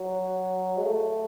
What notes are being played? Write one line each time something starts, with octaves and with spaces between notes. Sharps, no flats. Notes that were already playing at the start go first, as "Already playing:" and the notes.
Already playing: F#3
G#3
A3